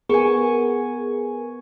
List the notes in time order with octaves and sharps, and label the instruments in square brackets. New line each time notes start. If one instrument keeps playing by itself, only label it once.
[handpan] B3 [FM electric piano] G#4 A#4 [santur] G#5 C#6